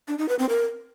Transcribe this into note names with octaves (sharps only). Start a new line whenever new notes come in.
D4
D#4
B4
C4
A#4